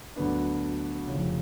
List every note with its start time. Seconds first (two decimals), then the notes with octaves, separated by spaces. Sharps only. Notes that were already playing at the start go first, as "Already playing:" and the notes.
0.16 D2 D3 F#3 B3 D4
1.07 F1 F2 C#3